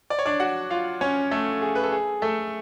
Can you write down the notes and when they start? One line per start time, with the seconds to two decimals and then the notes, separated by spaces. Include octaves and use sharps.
0.10 D5
0.19 C#5
0.26 D4 D5
0.40 F#4 F#5
0.70 F4 F5
1.01 C#4 C#5
1.31 A3 A4
1.62 G#4
1.75 B4
1.84 A4
1.92 G#4
2.22 A3 A4